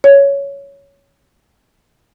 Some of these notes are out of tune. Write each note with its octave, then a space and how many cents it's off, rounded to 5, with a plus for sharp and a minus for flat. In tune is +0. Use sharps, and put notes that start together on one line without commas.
C#5 +10